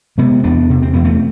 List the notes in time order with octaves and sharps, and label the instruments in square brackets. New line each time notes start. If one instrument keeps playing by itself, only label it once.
[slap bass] C3 G#3 B3
E2 B3 D4
C3
C4
E2 B3
A3 C4